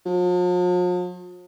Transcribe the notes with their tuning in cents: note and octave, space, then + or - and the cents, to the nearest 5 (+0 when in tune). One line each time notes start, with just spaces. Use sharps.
F3 +45